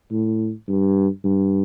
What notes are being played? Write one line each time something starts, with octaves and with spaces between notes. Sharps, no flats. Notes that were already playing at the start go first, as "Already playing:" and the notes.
A2
G2
G2